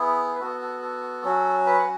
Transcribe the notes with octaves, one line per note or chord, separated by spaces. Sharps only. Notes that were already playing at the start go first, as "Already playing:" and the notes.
Already playing: B3 E4 G#4
B4
B3 F#4 A4
A4
A4
F#3 C#4 F#4
B4
F#5